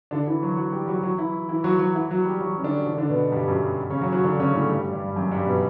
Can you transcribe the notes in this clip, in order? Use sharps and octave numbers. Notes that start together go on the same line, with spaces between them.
D3 D4
E3 E4
F#3 F#4
F#3 F#4
G3 G4
F#3 F#4
F#3 F#4
E3 E4
E3 E4
F#3 F#4
F#3 F#4
E3 E4
F#3 F#4
G3 G4
F#3 F#4
C#4
D3 D4
D3 D4
D3 D4
B2 B3
G2 G3
F#2 F#3
C#3 C#4
F#3 F#4
F#3 F#4
D3 D4
C#3 C#4
A2 A3
G2 G3
G2 G3
F#2 F#3
G2 G3
B2 B3